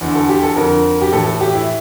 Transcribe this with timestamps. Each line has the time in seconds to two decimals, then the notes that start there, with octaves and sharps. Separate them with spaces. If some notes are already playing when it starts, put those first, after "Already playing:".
0.01 E2 D3
0.15 A4
0.29 G4
0.43 A4
0.56 F2 D3 A#4
1.02 G4
1.12 A2 E3 A4
1.26 A4
1.41 G4
1.55 E4